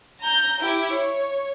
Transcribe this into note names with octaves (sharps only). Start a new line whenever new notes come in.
A#5 G6
E4 G4
C#5